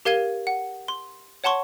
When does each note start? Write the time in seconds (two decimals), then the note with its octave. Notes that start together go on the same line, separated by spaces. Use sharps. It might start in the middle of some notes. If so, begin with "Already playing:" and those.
0.05 G4 A#4 F5 G#6 D#7 G7
0.47 F#5
0.88 C6
1.44 C#5 F#5 A5 C6 C#6